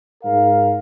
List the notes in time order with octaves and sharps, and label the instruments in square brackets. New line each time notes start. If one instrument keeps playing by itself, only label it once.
[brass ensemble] G#2 A#4 F5